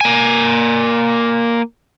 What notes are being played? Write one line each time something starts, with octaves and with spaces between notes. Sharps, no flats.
A#3 G#5